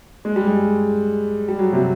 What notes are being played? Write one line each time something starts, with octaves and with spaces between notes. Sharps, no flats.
G#3
G3
G#3
G3
F#3
C3